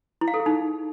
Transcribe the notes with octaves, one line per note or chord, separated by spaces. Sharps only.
E4
F5
A4
G#4
D#4